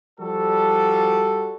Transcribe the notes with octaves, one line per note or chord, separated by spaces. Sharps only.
F3 G3 F#4 A4